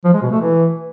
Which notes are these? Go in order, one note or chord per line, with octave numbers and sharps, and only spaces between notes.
F3
G#3
B2
A3
E3